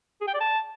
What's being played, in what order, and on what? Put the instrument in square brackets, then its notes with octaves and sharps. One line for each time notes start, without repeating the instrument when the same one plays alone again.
[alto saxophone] G#4
G5
D5
A5